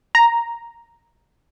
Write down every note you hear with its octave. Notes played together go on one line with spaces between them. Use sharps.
A#5